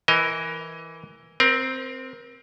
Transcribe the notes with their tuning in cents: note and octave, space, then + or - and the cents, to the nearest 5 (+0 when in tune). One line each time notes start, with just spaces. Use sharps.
E3 +0 A#4 +0 D#5 +25
C4 +0 A#4 +35